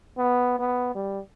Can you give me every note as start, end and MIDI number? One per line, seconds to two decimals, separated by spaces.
0.17 0.59 59
0.59 0.93 59
0.95 1.19 55